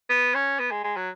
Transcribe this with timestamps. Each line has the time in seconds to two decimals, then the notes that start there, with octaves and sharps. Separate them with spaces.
0.10 B3
0.35 C#4
0.60 B3
0.71 G#3
0.84 G#3
0.96 F#3